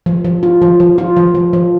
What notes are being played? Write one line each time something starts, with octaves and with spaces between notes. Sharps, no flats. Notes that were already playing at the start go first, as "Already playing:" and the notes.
F3
F3
F4
F3
F3
F4
F3
F3
F3